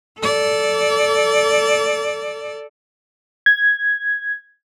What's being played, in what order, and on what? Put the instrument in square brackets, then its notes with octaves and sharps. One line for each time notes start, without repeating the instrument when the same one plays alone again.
[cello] A4 D5
[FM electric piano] G#6